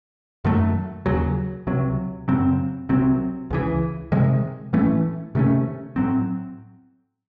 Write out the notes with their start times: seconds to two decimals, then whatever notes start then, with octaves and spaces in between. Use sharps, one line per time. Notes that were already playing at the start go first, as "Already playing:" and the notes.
0.44 F#2 D#3 F#3 A3
1.06 D#2 C#3 F#3
1.67 C#2 C3 F#3
2.28 F#2 C#3 F#3 C4
2.89 C2 C3 F#3 C4
3.50 C#2 C#3 E3
4.12 C3 D#3 G#3
4.73 A2 E3 A3 C#4
5.35 C3 D#3 A3 C#4
5.96 A2 F#3 C4